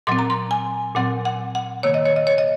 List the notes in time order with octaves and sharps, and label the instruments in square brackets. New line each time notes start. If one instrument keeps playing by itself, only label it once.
[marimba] A#2 F#3 C4 C6
A#5
C6
G#5
A#2 F#3 C4 F#5
F#5
F#5
C3 D#3 A#3 C#5
D#5
C#5
D#5
C#5
D#5